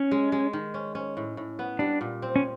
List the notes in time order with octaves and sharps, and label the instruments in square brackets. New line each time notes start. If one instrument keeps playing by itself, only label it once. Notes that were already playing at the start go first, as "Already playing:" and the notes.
Already playing: [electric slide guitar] C#4
[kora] G#3
G#3
D#3
C#4
C#4
A2
A2
B3
[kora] G3 [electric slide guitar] D4
[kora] A#2
C4
[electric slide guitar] C#4